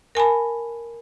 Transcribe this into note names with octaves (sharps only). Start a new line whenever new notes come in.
A#4 G#5 A5 B5